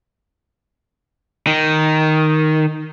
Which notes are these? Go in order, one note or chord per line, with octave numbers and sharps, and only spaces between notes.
D#3